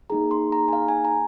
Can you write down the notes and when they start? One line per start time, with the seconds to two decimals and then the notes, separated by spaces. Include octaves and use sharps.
0.10 A#3 D#4 G#4 A#5
0.31 C6
0.52 A#5
0.68 G#5
0.73 F5
0.88 G#5
1.05 A#5